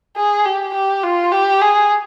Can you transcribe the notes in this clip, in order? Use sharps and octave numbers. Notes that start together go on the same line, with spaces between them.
G#4
G4
G4
F4
G4
G#4